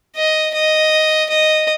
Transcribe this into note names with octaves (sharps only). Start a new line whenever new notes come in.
D#5
D#5
D#5